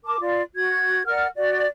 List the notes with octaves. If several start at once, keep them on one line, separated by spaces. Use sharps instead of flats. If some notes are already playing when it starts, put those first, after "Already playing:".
A#4 A5 D6
F4 D5
F#4 G#6
A#4 D5 F#5 F6
F#4 D5